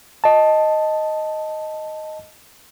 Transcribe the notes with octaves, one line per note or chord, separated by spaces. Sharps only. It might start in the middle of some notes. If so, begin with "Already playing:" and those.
D#5 A5